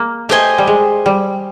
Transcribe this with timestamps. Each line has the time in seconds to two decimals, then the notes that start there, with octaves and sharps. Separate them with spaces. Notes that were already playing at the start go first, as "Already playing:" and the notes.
Already playing: A#3
0.29 A3 G4 C5 D#5 G#5
0.58 G3
0.67 G#3
1.06 G3